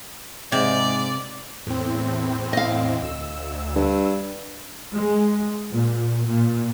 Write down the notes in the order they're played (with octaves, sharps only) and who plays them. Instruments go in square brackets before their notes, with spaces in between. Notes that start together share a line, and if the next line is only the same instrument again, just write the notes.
[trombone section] G#2 [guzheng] C3 [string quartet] D5
[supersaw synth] E2 C4 [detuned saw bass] A2
[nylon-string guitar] D#5 F5
[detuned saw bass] D2 [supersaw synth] E6
[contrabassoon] G2
[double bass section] G#3
A#2
A#2